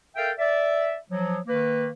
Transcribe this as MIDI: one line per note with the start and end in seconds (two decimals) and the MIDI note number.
0.16 0.31 69
0.16 0.31 70
0.16 0.31 76
0.16 0.31 77
0.16 0.31 79
0.39 0.95 74
0.39 0.95 76
1.10 1.38 53
1.10 1.38 54
1.48 1.88 51
1.48 1.88 58
1.48 1.88 71